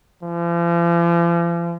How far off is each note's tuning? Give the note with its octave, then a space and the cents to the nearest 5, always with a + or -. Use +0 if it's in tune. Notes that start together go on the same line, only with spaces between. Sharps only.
F3 -45